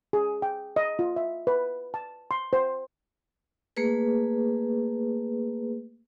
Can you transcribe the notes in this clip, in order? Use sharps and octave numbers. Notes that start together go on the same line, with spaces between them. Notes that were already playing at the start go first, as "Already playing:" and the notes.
G#4
G5
D#5
F4
E5
B4
A5
C6
C5
A3 A#3 G#4 B4